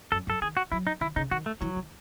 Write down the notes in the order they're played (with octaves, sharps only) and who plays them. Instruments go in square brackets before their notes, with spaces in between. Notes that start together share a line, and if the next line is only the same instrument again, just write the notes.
[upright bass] F#2 [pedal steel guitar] A4
[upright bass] F#2
[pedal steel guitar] A4
[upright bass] D#3 [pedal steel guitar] G#4
[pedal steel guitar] F#4
[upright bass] F#3 [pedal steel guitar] E4
[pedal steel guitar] D#4
[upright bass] D#3 [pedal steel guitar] E4
[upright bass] C#3 [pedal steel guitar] D#4
[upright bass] D#3 [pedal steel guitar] F#4
[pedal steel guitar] A3
[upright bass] E3 [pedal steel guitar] F#3
[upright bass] D#3